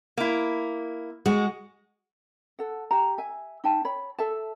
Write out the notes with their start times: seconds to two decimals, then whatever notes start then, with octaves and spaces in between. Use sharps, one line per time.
0.17 A#3 E4
1.26 G#3 F#4
2.59 A4 F#5
2.91 G4 A#5
3.18 E5 G#5
3.64 D#4 E5 G5 A5
3.85 C#5 B5
4.19 A4 E5 A5